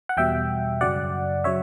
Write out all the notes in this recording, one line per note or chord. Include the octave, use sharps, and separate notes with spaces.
F#5
E2 B2 G3 E5 G5
F#2 C#3 F#3 D5 F#5
C#3 F#3 C#5 E5